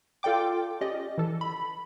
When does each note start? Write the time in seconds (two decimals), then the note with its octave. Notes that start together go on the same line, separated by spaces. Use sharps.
0.23 F4 A4 D5 G5 D6
0.81 C#4 G4 D5 D#5
1.18 E3 A4
1.41 B5